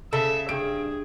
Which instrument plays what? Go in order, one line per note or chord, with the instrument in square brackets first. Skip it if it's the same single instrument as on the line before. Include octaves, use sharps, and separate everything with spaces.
[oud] C#3 [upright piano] A4 [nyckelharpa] E5
[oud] G2 [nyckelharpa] G#4 [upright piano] D7